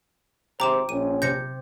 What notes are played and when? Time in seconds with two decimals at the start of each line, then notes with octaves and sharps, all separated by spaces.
0.60 G#1 C3 C5 G5 A#5 D6 E7
0.89 A#1 C#4 D#7
1.22 C3 G6 A#6 C#7